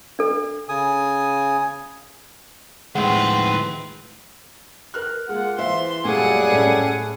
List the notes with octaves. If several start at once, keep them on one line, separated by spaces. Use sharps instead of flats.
D4 A4
C#3 G#5 D#6
D#2 A2 D#3 F3 G#3 C4 B4 F#5
A#4 F6 F#6
G#3 A#3 F4 F#5
E3 C5 E5 F5 C6
F#2 A#2 G3 A3 G#4 D5 F#5
A2 C#4 G4 A4